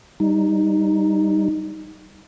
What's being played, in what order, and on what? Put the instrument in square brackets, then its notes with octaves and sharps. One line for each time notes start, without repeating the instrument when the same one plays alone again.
[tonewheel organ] G3 D#4